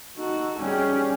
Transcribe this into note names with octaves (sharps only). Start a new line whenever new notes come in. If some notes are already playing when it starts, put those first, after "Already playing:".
D#4 F#4 A4
G3 C#4 G4 G#4